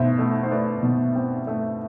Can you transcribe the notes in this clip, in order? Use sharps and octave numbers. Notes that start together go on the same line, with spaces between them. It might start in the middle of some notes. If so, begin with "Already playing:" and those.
Already playing: B2 A3 C5 E5
A3
C5
A3 B4 D5
B2
C4
A3